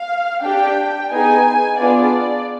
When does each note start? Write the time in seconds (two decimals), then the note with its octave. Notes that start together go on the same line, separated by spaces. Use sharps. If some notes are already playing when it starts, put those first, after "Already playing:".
Already playing: F5
0.43 D4 G4 G5
1.12 B3 D#4 G#4 G#5
1.80 B3 D4 F4 G#4 D5